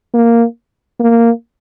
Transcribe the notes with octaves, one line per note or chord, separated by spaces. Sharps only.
A#3
A#3